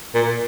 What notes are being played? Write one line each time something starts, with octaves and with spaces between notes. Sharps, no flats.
A#2